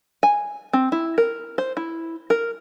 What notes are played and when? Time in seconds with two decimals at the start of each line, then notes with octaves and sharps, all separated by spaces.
0.23 G#5
0.73 C4
0.92 E4
1.18 A#4
1.58 C5
1.77 E4
2.30 A#4